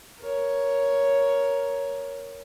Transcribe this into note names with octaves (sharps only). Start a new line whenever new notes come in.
A#4 C#5